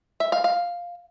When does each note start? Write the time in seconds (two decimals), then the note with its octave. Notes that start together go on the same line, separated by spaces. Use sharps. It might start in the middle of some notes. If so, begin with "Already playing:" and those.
0.20 E5
0.32 F5
0.44 F5